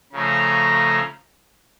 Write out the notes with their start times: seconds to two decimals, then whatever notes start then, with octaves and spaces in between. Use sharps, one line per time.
0.13 C#3 F3 A3 C#4 A#5